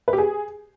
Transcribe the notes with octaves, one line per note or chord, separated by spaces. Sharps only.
B4
G4
G#4